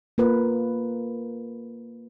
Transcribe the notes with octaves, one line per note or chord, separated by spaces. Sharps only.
A#3 F4 A#4 B4